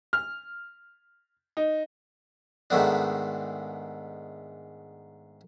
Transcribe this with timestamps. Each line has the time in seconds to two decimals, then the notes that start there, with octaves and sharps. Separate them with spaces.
0.13 F6
1.57 D#4
2.70 G#2 D#3 A3 B3 D4